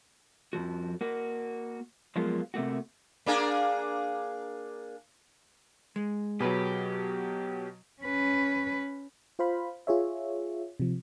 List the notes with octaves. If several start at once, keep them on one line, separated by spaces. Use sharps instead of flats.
F2 D#3 F3 F#4
A#3 F#4
F3 F#3 G#3 A#3 B3 F4
C3 A3 A#3 F#4
A#3 D4 G#4
G#3
B2 F#3 G4 G#4 B4
C#4 B4
F4 C5 F5 B5
F4 G#4 C#5 E5
C3 F3